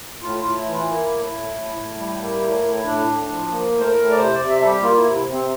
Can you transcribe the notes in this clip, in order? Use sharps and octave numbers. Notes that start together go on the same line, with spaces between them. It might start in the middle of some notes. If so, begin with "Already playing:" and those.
A2 F4
F4
A2
E4
E3
F4
A#3 E4
A2
A2
A2
A2
G3
A#3
A2
A2
A2 D4
A2
D4
F3
A#3
A2
C5
A#4
A2
D5
C3 C5
D5
C3
E5
G3 A4
G4
A#3 F4
E4
C3
C3
C4